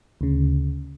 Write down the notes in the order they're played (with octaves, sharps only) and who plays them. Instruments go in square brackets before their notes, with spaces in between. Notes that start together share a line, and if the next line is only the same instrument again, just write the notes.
[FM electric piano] D2 C#3